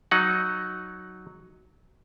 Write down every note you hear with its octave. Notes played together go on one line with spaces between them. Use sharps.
F#3 D#4 F#5